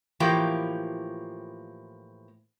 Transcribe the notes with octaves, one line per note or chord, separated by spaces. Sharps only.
A2 E3 F3 A#3 G4 G5